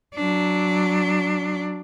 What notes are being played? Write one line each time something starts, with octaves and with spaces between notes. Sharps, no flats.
F#3 D4